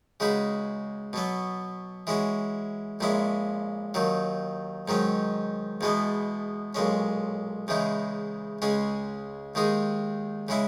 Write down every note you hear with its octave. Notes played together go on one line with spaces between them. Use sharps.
C#3 G#3 D#4 F#4 B4
B2 F#3 B3
E3 G#3 C#4 F#4
A#1 A#2 G#3 C#4 E4
D#2 D#3 F#3
G#2 D#3 F#3 C#4
E2 B2 G#3 B3
B1 A#2 G#3 C#4
E2 C#3 E3 G#3 D#4
C#2 C#3 G#3 C#4 G#4
D#2 D#3 G#3 D#4 G#4
C#3 G#3 C#4 E4